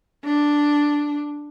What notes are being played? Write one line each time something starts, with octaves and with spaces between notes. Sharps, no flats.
D4